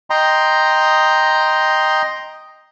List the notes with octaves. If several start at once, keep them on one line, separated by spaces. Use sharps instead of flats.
D#5 G5 A#5 C6